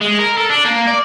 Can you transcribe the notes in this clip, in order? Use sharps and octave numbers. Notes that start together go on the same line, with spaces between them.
G#3
A#4
A4
D4
A#3
D5